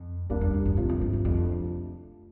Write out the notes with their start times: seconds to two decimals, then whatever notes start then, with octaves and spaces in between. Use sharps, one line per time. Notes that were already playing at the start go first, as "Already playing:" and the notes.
Already playing: F2
0.30 F2 G3 A#3 D4
0.41 F2
0.54 F2
0.65 F#2
0.77 F#2 C3 F3 A3 D4 F4
0.89 G2
1.01 G2
1.13 F2
1.25 F2 C3 F3 A3 D4 F4